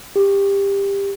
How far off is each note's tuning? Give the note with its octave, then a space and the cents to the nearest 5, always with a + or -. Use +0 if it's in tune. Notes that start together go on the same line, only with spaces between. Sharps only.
G4 +20